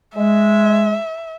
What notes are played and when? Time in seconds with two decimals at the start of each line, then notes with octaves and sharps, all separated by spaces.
0.16 G#3 E5